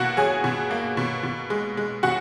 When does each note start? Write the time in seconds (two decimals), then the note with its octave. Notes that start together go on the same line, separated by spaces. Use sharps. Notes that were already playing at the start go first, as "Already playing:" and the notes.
Already playing: B2 A#3 F#4 F#5
0.17 F#3 G#4 G#5
0.44 B2
0.71 A#3
0.97 B2
1.23 B2
1.50 G#3
1.77 G#3
2.03 B2 F#4 F#5